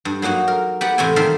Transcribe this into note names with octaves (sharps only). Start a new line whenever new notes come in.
G2
F#3 A#3 D#4 F#4
A#4
B3 G4 D5 F#5
E2 A2 C3 C4 G5 G#5
D#3 G3 A#3 E5 A5 C6